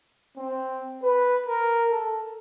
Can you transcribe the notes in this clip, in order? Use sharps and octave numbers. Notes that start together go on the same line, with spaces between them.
C4
B4
A#4
A4